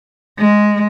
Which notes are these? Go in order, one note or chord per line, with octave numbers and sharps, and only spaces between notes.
G#3